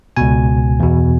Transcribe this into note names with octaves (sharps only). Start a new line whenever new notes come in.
C#2 B2 G#5
E2 B2